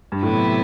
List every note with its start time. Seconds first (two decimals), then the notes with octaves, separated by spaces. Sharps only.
0.12 G2
0.22 A2 C3 F#3 B3 E4 B4